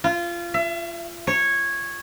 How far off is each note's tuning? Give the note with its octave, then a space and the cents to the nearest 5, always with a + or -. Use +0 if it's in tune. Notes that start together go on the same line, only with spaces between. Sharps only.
F4 -20
E5 +35
C#5 -10